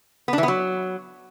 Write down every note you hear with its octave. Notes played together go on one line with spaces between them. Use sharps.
B3
D4
E3
B3
F#3